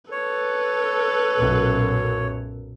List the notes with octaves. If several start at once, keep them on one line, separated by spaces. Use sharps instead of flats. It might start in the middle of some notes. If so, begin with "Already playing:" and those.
A4 B4 C#5
B1 F#2 A#2